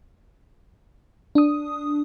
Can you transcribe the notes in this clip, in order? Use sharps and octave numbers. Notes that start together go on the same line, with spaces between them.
D4 D#6